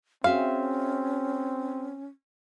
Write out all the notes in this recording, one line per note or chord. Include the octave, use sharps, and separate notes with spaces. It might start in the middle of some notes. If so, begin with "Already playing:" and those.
C4 C#4 F#4 G#4 E5 F5